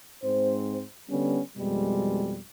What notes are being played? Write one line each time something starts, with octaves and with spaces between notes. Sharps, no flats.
G#2 C4 C5
D3 G3 B3 C#4
F2 B2 G3 G#3